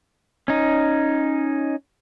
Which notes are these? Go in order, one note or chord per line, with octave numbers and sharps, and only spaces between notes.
C#4 D#4